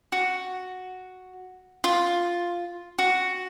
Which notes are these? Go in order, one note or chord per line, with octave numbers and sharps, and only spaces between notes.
F#4
F4
F#4